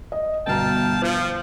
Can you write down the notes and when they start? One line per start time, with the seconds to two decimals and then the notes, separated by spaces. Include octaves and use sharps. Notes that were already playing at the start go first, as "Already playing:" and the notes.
0.12 D#5
0.47 G1 B2 F5 G5 A5 A#5
1.02 F3 C5